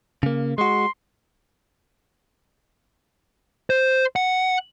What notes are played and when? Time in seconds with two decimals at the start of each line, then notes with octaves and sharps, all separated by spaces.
0.23 C#3 A#3
0.58 G#3 F#4 C6
3.70 C5
4.16 F#5